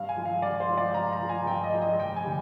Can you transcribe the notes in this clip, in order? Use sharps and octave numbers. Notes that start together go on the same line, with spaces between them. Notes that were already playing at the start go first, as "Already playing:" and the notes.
Already playing: G2 F5
G#5
F3 G#3
F5
G2 D5
C5
F3 G#3
D5
G2 A#5
A#5
F3 G#3
G#5
G2 G5
D#5
F3 G#3
D#5
F1 G5
G#5
D3 G3